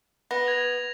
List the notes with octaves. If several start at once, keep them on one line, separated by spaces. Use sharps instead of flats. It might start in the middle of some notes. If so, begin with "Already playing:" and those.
B3 A#6
G#6 A#6 F7